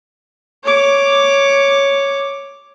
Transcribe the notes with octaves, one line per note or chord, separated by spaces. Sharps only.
C#5 D6